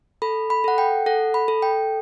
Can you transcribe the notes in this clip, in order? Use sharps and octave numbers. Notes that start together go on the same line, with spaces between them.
A4 B5
B5
A4 F#5
G5
A4 F#5
B5
A4
G5